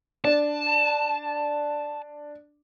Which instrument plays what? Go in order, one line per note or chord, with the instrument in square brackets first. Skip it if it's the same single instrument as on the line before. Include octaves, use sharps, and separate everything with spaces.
[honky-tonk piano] D4 [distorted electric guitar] A5